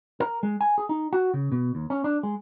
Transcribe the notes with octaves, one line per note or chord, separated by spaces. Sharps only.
A#4
G#3
G#5
G#4
D#4
F#4
C#3
B2
D#2
C#4
D4
G#3